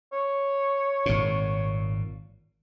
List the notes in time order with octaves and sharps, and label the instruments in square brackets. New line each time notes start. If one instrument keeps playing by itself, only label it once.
[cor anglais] C#5
[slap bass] G#1 A#2